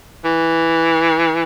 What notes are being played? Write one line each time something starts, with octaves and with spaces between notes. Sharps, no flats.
E3